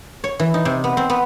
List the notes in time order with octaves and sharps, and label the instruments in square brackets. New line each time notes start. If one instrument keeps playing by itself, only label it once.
[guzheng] C#5
E3
D#4
C3
B3
C4
B3